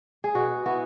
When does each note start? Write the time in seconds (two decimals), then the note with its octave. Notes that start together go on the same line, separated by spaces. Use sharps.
0.24 G#4
0.35 B2 F#4
0.66 B3 E4 F#4